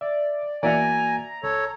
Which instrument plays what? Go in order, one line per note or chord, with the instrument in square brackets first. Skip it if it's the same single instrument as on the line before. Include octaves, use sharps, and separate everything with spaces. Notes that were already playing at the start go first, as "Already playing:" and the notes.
[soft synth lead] D5 [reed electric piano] E5
[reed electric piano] E2 A#3 F#4 [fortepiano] D5 E5 F#5 [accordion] G#5 [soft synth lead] A#5
[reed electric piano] C#2 [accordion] A4 C#5